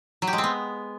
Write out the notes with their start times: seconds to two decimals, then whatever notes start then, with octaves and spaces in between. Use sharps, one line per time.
0.22 F#3
0.27 G4
0.33 G#3
0.38 C4
0.44 B3